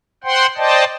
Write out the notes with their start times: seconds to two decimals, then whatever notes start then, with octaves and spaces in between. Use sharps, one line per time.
0.24 C5 F#5 G5 C6
0.57 C5 D5 D#5 G5 A5